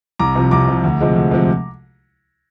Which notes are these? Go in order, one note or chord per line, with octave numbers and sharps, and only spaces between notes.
C2 A#5 D6
C3 F3
C2 A#5 D6
C3 F3
D2
C3 F3 G#3
D2
C3 F3 G#3